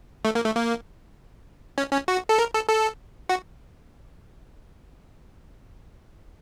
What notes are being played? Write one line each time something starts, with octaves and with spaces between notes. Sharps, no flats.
A3
A#3
A3
A#3
C#4
C#4
F#4
A4
A#4
A4
A4
F#4